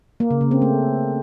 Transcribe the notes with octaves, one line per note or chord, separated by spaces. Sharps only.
A#3
C#3
C#3
C4
A3